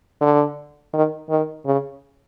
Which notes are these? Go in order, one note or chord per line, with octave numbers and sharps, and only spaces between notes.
D3
D#3
D#3
C#3